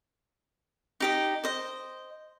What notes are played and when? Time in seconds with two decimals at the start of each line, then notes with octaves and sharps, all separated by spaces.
1.00 D#4 G4 D#5
1.44 C5 D#5